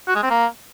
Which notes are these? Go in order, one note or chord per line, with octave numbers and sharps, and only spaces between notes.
F#4
G#3
C4
A#3